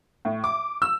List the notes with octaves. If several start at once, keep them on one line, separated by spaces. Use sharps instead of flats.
A2
D6
E6